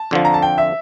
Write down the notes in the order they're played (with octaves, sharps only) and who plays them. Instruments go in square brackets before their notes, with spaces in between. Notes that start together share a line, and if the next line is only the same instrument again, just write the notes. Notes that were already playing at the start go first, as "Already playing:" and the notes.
Already playing: [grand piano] A5
[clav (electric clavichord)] F2 D3 F3
[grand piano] A#5
A5
G5
E5